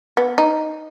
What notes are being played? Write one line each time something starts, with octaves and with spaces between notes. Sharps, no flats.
B3
D#4